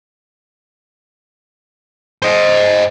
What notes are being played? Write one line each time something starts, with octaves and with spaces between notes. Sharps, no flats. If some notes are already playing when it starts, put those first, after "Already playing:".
C5 D#5